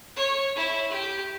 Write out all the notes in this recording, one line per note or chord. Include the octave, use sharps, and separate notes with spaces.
C#5
E4
G4